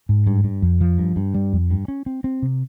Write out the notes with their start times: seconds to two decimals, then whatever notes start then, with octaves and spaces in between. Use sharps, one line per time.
0.09 G#2
0.27 G2
0.44 G2
0.62 F2
0.81 F3
0.98 G2
1.16 G2
1.34 G3
1.53 F2
1.70 G2
1.88 C#4
2.06 C4
2.24 C4
2.42 C3